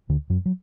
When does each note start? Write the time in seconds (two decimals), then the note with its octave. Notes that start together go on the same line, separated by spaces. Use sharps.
0.09 D2 D3
0.30 F#2 F#3
0.46 F#3